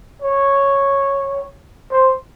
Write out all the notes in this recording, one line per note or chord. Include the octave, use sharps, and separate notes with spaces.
C#5
C5